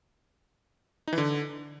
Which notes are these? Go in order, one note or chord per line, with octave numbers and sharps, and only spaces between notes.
D#4
E3
D3